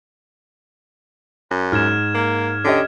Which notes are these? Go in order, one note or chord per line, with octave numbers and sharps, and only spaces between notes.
F#2
G#2 F6 G#6 E7
A#3
D3 C#4 G4 D#5